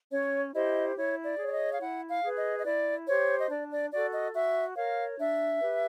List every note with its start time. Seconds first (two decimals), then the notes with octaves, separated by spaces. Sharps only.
0.12 C#4 C#5
0.54 E4 G4 C5 D#5
0.96 E4 C#5
1.25 D5
1.38 G#4 C#5
1.48 D5
1.52 D#5
1.72 F5
1.80 E4 F#5
2.08 F5
2.23 G#4 B4
2.37 D#5
2.58 D#5
2.65 E4 D5
3.07 G4 C5 C#5
3.39 D#5
3.49 D4 D5
3.71 D5
3.91 F#4 A4 D5
4.13 D#5
4.34 F#4 E5
4.75 A#4 C#5 F5
5.17 D4 E5
5.60 G4 B4